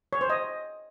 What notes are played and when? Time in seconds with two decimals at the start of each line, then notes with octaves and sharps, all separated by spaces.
0.13 C#5
0.21 C5
0.30 D#5